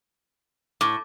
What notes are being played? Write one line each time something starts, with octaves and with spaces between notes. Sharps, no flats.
A2 D6